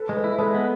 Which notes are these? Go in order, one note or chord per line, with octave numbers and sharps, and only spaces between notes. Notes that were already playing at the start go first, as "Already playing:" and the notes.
Already playing: A4 B4
G#3
A4 B4
E4
G#3 A4 B4
B3